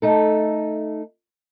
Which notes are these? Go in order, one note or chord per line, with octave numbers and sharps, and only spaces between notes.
A3 D#4 A4